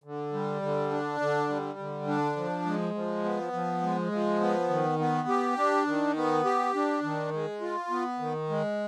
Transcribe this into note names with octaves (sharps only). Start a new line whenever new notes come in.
D3
G3
D3
D4
D3
G3
D3
D4
F3
G#3
F3
B3
F3
G#3
F3
B3
D#3
B3
G4
D4
D#3
B3
G4
D4
D#3
G#3
F4
B3
D#3
G#3